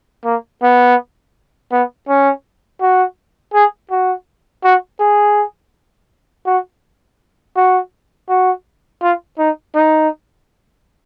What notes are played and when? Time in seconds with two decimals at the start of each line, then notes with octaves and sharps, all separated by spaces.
0.25 A#3
0.62 B3
1.71 B3
2.08 C#4
2.81 F#4
3.53 G#4
3.91 F#4
4.64 F#4
5.00 G#4
6.46 F#4
7.56 F#4
8.29 F#4
9.02 F4
9.38 D#4
9.75 D#4